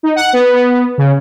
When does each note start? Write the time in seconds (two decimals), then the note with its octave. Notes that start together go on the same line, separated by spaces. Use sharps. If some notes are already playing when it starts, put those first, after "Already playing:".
0.03 D#4
0.16 F#5
0.33 B3
0.55 B3
0.98 C#3